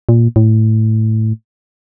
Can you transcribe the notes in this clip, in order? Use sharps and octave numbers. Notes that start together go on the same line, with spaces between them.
A#2
A2